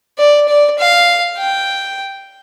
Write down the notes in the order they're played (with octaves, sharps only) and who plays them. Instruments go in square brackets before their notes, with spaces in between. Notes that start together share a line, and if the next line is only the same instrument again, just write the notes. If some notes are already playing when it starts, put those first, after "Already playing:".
[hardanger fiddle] D5
D5
F5
G5